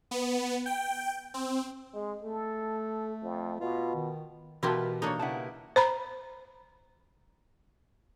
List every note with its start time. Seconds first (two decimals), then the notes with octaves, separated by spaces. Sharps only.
0.11 B3
0.66 G5
1.34 C4
1.94 G#3
2.24 A3 A4
3.22 F2
3.60 B2 F4
3.95 D#3
4.63 B2 E3 E4 F4 G4 A#4 B4 A5
5.02 A#3 D4 D#4 A4 C5 C#5
5.19 C#3 G3 E4 F#5 A5
5.76 C5 A#5 B5